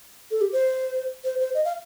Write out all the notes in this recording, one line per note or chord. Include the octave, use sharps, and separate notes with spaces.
A4
G4
C5
C5
C5
D#5
F5